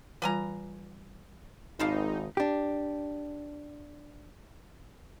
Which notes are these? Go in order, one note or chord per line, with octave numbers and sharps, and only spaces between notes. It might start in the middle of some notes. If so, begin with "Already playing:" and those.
E3 G3 F4 B4 G#5 A#5
G#1 E3 F3 D#4 F5
D4 G4